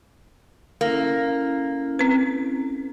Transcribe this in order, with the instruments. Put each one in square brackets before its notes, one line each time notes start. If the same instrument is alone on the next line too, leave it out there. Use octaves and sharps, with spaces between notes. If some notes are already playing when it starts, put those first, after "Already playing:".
[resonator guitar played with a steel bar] A#3 [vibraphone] C#4 E4 A4
[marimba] C4 B4